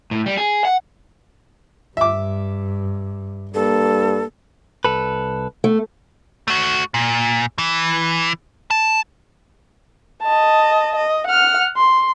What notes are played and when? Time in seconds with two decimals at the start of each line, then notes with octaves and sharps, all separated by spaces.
0.11 A2
0.26 G3
0.37 G#4
0.65 F#5
1.97 G2 E5 D6
3.54 G2 A#3 A4
4.85 C2 A4 B4
5.64 A3
6.48 A3 F#4
6.94 A#2
7.58 E3
8.71 A5
10.23 D#5 A5
10.96 D#5
11.27 F#5 F6
11.77 C6